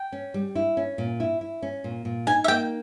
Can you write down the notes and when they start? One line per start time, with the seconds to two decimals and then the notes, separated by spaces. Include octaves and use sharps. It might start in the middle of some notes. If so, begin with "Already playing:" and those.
Already playing: G5
0.12 C#4
0.34 G3
0.55 E4
0.77 C#4
0.98 A#2
1.20 E4
1.41 E4
1.62 C#4
1.84 A#2
2.05 A#2
2.27 D#4 G#5
2.44 E5
2.48 A#3 G5